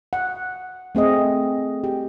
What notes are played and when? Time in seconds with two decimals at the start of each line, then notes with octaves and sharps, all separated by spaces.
0.13 F#5
0.95 A3 C4 G#4 D#5
1.84 G4